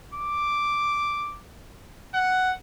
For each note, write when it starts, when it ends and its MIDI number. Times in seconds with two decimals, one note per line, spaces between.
0.14 1.38 86
2.14 2.52 78